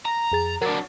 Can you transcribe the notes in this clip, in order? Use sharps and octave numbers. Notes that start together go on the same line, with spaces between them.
A#5
F2 G#4 A6
F#3 D4 A#4 A6